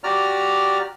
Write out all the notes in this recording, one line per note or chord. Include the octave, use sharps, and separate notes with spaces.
F#4 G4 D5 A#5 F6